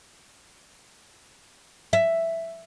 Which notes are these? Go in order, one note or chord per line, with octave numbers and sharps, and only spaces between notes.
E5